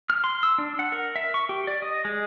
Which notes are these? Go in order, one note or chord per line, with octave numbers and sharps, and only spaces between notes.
F6
C6
E6
D4
F#5
A#4
E5
C#6
G4
D5
D#5
G#3